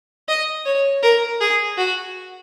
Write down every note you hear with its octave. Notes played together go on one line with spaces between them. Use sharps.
D#5
C#5
A#4
G#4
F#4